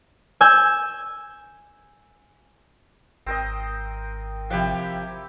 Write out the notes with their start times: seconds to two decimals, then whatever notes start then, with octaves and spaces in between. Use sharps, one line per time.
0.41 G#5 E6 G6 G#6
3.26 G#1 C4 A#4 D#5
4.51 C3 F3 E4 G4 F#5